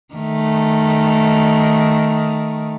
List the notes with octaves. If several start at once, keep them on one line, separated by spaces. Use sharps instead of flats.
D#3 A3